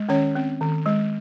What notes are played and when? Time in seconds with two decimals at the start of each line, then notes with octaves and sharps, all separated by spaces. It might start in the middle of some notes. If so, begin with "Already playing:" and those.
Already playing: G#3
0.09 D#3 C#4 C#5
0.35 C4
0.61 D#3
0.86 G#3